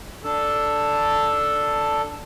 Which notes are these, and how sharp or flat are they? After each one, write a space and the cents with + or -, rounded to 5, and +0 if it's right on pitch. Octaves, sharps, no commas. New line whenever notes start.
D4 +0 A4 +0 A5 +0